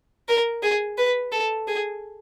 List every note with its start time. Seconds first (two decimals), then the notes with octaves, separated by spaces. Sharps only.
0.28 A#4
0.63 G#4
0.98 B4
1.32 A4
1.67 G#4